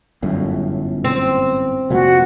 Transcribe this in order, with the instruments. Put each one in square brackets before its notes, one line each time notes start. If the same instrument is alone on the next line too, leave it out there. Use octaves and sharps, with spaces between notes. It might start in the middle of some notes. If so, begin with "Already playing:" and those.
[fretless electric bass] G1 F#2 A2
[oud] C4
[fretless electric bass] F1 A#2 [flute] F#4